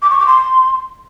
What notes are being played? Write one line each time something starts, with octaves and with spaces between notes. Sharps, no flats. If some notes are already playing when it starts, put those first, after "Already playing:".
D6
C#6
D6
C6